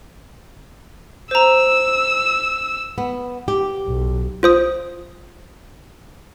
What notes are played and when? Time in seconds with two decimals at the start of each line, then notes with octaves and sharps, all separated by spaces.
1.31 C5 A#5 E6
2.98 B3
3.48 G4
3.87 B1
4.43 F4 C5 D#6